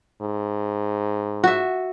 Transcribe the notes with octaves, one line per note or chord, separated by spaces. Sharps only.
G#2
F#4 E5